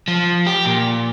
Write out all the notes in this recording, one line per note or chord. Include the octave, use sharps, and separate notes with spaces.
F3
G4
A#2